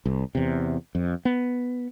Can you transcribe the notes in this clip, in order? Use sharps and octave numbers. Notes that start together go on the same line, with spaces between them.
C2
E2 C3
F2
B3